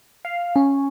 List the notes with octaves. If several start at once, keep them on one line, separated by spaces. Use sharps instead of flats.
F5
C#4